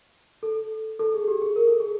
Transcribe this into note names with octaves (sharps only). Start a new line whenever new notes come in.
A4
A4
G#4
G4
G#4
A#4
A4
G#4